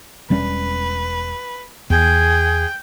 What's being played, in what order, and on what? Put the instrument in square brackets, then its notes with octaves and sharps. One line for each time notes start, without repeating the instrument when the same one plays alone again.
[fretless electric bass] E1 G3 C#4 [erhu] B4
[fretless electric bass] E2 [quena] G#4 [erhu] G5